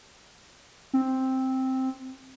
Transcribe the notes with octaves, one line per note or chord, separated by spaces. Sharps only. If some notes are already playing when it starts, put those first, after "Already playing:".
C4